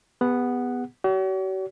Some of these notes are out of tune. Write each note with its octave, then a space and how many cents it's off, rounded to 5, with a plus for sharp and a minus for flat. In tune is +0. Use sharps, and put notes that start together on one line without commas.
B3 +0 G#4 -45 F#5 +0
F#4 +45 C#5 +45